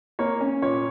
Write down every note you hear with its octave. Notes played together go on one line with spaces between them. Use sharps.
A#3 C#5
C#4
A#2 C#5